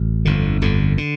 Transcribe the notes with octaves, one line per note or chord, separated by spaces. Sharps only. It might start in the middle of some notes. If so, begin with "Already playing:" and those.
Already playing: A1
G1 F2 D3
G1 F2 D3
D3